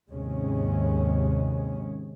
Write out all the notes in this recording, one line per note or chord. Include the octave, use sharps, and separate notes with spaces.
D#2 G#2 C3 G#3 C#4